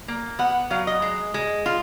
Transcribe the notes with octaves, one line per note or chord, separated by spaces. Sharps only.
A#3
B3 F#5
F#3 F5
D#5
G#3
G#3
F4